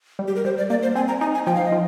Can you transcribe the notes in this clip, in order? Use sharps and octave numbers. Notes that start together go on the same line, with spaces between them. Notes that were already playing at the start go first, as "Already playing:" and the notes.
G3
G4
A#4
G3 C5
D5
A#3 D5
C5
C4 G#5
A#5
D#4 G#5
G#5
F3 G5
F5
D#5
F3